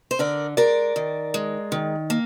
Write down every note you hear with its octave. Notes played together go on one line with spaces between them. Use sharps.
C5
D3 A#4 D5
G#3 A#4 D5
D#3
G#3
D#3
A#3